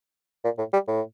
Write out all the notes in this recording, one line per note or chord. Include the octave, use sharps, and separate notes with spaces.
A#2
A2
G3
A2